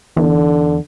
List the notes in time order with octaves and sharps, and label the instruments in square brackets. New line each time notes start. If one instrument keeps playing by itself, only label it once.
[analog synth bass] E2 [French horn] D3